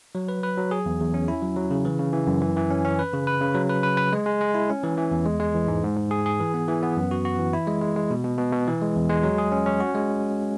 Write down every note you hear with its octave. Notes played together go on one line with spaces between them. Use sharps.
F#3
B4
B4
F#3
G#4
E2
E2
C#4
E4
F#3
F#3
C#3
E3
C#3
E3
F#2
E3
E3
C#4
C#4
B4
C#3
B4
C#3
F#3
B4
B4
B4
G#3
G#3
G#3
E4
C#4
E3
E3
E2
G#3
G#3
E3
G#2
G#2
G#2
G#4
G#4
E3
B3
E3
B3
F#2
F#4
F#4
E3
E4
G#3
G#3
G#3
B2
B2
B2
B2
E3
G#3
E2
G#3
F#3
G#4
C#4
C#4
F#4
G#3